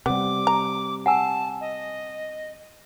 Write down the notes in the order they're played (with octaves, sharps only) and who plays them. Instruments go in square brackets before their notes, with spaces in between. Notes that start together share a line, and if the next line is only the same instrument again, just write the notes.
[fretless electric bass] C3 G3 [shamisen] B3 [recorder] D6
[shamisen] A#5
[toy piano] F#5 G#5 E6 [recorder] A5
[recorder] D#5